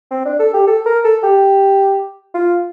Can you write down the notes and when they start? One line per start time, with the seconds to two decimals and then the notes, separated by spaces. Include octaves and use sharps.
0.11 C4
0.25 D4
0.39 A4
0.53 G4
0.67 A4
0.86 A#4
1.04 A4
1.23 G4
2.34 F4